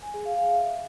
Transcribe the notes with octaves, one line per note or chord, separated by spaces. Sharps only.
G#5
G#4
F5
F5
E5